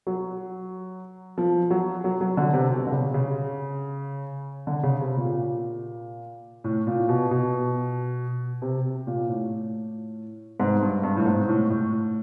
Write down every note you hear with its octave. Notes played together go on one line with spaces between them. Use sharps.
F#3
F3
F#3
F#3
F#3
D3
C3
B2
D3
C#3
C#3
D3
C#3
C3
A#2
A2
A#2
B2
B2
C3
A#2
A2
G#2
G2
G2
A2
G#2
A2
A2